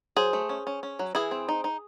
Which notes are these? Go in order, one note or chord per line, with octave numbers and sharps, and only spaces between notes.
F#3 G#4 C5
A3
C#4
C#4
C#4
F#3
E3 E4 G#4
C4
D#4
D#4